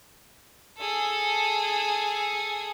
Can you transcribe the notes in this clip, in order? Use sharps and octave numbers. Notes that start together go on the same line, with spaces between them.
G#4 A4